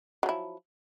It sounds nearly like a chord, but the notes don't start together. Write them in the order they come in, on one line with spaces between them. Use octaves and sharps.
F#3 F3 E4